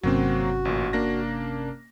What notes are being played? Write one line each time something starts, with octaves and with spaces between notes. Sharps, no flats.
G1 C3 F#3 A#3 C4 C#4 F#4
A1 A#2
A#3 D4 A#6